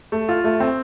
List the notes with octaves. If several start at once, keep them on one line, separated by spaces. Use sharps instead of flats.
A3
F4
A3
C4